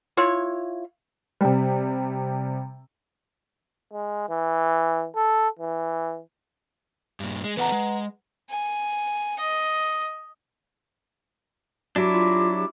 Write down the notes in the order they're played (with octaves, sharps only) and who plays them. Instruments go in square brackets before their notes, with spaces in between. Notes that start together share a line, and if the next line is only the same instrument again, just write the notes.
[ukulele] E4 F4 C#5
[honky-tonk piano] C3 G3
[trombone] G#3
E3
A4
E3
[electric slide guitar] G2 A#2
G#3
[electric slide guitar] E3 B3 A4 [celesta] B4 F#5 A#5
[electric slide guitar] G#3
[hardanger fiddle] G#5
D#5
[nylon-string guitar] F#3 [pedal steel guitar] D4 E4 [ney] G4
[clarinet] F4